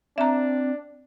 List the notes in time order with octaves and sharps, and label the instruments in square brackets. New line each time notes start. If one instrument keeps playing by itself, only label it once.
[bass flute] C4 [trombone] D4 [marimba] E5 A#5